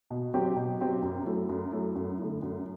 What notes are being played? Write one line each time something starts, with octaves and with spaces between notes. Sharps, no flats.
B2
F#3 C4 G4
B2
F#3 C4 G4
F#2
F#3 A3 E4
F#2
F#3 A3 E4
F#2
D3 A3 E4
F#2